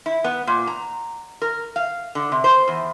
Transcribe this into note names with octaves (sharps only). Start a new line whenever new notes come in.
E4
B3
A#2
A#5
A#4
F5
D3
C3
C5
E2